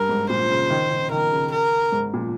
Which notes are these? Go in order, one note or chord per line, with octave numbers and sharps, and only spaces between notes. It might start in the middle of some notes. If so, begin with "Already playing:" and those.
Already playing: G2 A#4
G#2
A#2 C5
C#3
D#3
D#3
D#3 A#4
C#3
A#4
G#2
A#2